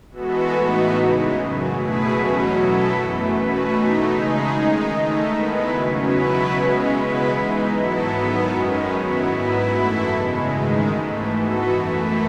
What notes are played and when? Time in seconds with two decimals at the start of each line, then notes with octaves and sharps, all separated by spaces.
0.11 E3 G#3 B3 F#4 A4
0.50 A2 E3 B3 D#4 F#4
0.90 C#3 E3 G#3
1.31 F#2 C#3 F#3
1.70 B2 A3 E4 G#4 B4
2.10 E2 B2 F#3 C#4
2.50 F#3 B3 E4 A4
2.90 F#2 E3 A3
3.30 B2 A3 C#4 F#4 B4
3.70 E3 A3 D#4
4.10 C#3 G#3 D#4 G#4
4.50 D#3 G#3 D#4
4.90 D#3 A3 D#4 A4
5.29 D#3 G#3 B3 E4 B4
5.69 E2 C#3 F#3 C#4
6.09 B2 F#3 B3 E4 B4
6.49 C#3 G#3 C#4
6.88 C#3 G#3 B3 E4 B4
7.29 E3 G#3 D#4
7.68 G#2 F#3 B3 E4 A4
8.09 D#3 F#3 B3
8.48 F#2 D#3 G#3 C#4
8.89 F#3 B3 E4
9.28 G#2 F#3 B3 E4 B4
9.68 F#2 E3 A3 E4 A4
10.08 E2 C#3 G#3
10.48 G#2 D#3 G#3
10.88 G#2 E3 A3
11.28 E3 B3 F#4 A4
11.68 F#2 E3 A3